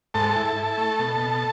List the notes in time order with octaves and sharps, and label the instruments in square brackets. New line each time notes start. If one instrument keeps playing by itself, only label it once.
[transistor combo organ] G#2 A4 A5
E4
E4
A3
B2
B2